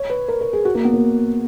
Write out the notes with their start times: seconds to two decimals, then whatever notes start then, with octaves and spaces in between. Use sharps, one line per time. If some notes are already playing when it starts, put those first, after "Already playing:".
Already playing: C#5
0.10 B4
0.28 A#4
0.41 A#4
0.53 G#4
0.65 F#4
0.75 A#3
0.85 B3
0.93 A#3